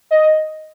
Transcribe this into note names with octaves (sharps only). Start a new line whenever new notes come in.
D#5